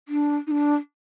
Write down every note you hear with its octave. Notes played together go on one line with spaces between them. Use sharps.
D4
D#4
D4